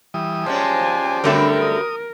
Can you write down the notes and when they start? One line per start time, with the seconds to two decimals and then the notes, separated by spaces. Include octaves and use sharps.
0.14 E3 G3 D#6
0.46 F3 G#3 C#4 G4 C5 D5 G#5 A5
1.24 G2 D3 F#3 G3 A3 C4 A#4
1.61 D#6